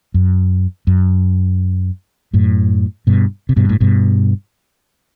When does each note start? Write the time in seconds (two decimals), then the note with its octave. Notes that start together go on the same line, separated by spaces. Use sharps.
0.14 F#2
0.87 F#2
2.33 F#2 A2
3.07 G2 B2
3.49 C3
3.56 G2 B2
3.69 A2
3.81 G2 B2